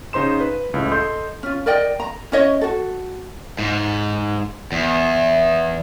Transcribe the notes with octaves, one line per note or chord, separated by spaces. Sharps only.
C#3 D#4 C5 C6 E7
B4
C#2 A2
A4 D#5 C6 G6
C#4 F4
A#4 D5 D#5 G5
A#5
C#4 E4 C#5 D#5
F#4 A4
G#2
E2